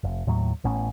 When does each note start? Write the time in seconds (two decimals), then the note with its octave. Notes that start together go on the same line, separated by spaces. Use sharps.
0.03 F1
0.27 D#2 A2 F#3
0.64 A1 A2 B3 C#4